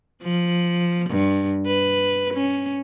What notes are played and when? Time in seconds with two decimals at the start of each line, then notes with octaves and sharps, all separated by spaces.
0.23 F3
1.10 G2
1.66 B4
2.34 C#4